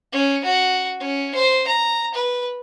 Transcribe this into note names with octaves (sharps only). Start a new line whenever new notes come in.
C#4
F#4
C#4
C5
A#5
B4